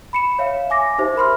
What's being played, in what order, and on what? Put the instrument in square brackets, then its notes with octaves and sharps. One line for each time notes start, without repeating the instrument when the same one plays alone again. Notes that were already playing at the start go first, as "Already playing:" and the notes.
[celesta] B5 C#7 E7
C#5 E5 F5
G#5 D6 A#6
D#4 G4 C5 E5
A#4 B5 C6 F6